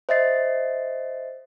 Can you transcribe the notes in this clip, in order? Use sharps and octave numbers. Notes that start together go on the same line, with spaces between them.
C5 D#5 E5 A6 C7